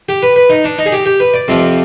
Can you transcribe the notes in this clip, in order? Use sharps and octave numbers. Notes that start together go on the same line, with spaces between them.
G4
B4
B4
D#4
D4
D#4
G#4
G4
G4
B4
D5
F2 C3 F3